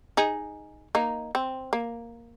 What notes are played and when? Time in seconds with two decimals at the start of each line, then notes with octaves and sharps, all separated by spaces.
0.17 D#4 G#4
0.95 A#3 D#4
1.35 C4
1.73 A#3